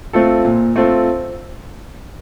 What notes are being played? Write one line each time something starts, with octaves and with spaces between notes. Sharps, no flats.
A3 C4 F4 A4
A#2
A3 C4 F4 A4